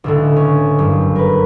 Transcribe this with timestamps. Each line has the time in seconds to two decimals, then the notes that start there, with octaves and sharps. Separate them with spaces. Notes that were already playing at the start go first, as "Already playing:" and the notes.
0.04 C#2 A2 D3
0.36 C#4
0.79 F#1 G2
1.16 A#4 B4